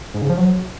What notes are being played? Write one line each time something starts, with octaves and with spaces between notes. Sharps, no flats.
G#2
C#3
F3
F#3